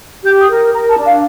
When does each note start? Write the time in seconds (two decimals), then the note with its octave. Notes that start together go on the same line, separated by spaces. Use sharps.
0.24 G4 G6
0.40 D#6
0.49 A#4
0.74 A#4 A#5
0.89 A5
0.97 D4
1.05 F5